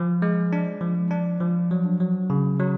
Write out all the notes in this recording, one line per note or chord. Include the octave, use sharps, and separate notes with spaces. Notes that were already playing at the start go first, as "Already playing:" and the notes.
Already playing: F3
G#3
D4
F3
D4
F3
F#3
F#3
C#3
F#3